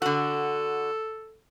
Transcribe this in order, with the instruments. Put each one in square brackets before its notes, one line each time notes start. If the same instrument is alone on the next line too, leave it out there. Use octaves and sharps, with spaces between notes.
[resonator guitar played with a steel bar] D3 F#4 [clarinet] A4